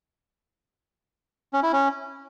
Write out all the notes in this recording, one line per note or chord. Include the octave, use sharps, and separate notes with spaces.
C#4
E4
C#4